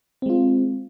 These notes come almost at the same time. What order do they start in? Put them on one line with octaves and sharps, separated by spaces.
C4 G#3 F4